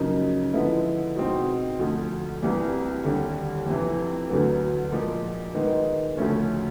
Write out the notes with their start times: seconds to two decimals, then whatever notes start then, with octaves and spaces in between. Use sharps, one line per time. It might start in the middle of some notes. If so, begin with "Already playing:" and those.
Already playing: F#2 C#3 F3 A#3 D#4
0.54 D3 F3 G#3 B3 E4
1.16 B2 G#3 C4 D#4
1.79 D2 D3 F3
2.42 C2 C3 E3 G3
3.05 D#2 D3 G3
3.66 F2 C3 E3
4.29 D2 D3 F#3 B3
4.92 A#2 F3 G#3
5.54 D#3 G#3 B3 D#4
6.17 D2 C#3 F3 A3 C#4